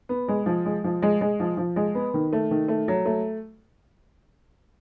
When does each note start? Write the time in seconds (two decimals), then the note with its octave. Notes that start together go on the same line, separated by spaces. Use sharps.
0.09 B3
0.28 G#3
0.46 F3
0.66 G#3
0.84 F3
1.02 G#3
1.21 G#3
1.40 F3
1.57 F3
1.76 G#3
1.95 B3
2.14 D#3
2.33 A3
2.51 D#3
2.68 A3
2.88 F#3
3.05 A3